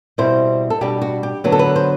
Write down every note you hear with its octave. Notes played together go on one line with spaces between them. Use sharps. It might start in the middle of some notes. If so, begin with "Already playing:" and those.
B2 G3 C4 E4 C5
A4
B2 G3 D4 G4
F#4
G4
D3 F#3 B3
A4
B4
C5